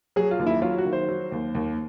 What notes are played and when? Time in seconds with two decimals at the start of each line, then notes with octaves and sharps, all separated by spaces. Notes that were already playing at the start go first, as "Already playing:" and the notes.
0.16 F#3 G#4
0.31 F4
0.39 D#2
0.47 E4
0.62 F#3 F4
0.78 F#4
0.85 D#3
0.93 C5
1.09 F#3
1.32 D#2
1.55 D#2